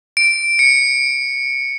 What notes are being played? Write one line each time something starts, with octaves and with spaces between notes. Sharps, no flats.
D7
C#7